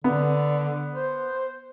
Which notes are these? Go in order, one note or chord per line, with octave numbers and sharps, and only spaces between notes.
D3 B3
C5